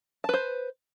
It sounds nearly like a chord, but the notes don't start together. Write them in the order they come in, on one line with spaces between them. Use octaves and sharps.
A5 B4 C5